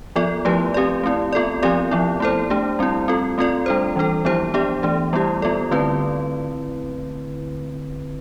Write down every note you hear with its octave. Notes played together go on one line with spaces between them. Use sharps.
F3 B3 F4 A4 D5
F3 A3 E4 G4 B4
C4 G4 D5
A3 C4 E4
B3 F4 A4 D5
F3 C4 G4 D5
F3 B3 E4
A3 E4 A4 C5
A3 D4 G4
G3 C4 E4
C4 F4 A4
A3 C4 F4 A4 D5
G3 D4 A4 C5
E3 G3 D4 A4
F3 B3 E4 G4 C5
B3 D4 G4 D5
E3 A3 D4 G4
G3 B3 E4 G4
G3 B3 F4 A4 D5
D3 A3 C4 E4 B4